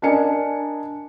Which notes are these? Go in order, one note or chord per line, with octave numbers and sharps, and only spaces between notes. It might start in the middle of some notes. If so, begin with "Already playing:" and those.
D4 A#4 D#5 G#5 C#7